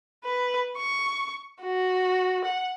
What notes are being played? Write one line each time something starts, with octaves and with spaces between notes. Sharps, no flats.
B4
C#6
F#4
F#5